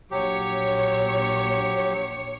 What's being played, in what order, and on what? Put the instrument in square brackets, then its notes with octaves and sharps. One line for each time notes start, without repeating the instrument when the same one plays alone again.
[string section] A#1 C#5 C#7 [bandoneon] F#3 G4